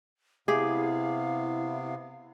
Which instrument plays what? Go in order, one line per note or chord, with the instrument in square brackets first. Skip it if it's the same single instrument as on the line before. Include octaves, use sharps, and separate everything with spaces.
[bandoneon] C3 B3 [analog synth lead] E4 [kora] G4 G#4 [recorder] F5